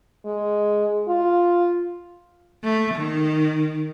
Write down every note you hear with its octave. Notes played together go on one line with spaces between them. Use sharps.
G#3
F4
A3
D#3